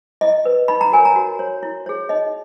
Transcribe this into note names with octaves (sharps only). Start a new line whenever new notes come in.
E4 D#5
B4
D#4 B5
A#5
F#4 A#4 C#5 G#5
A#5
F#4
C#5
E4
G#4 C#5
D#4 D#5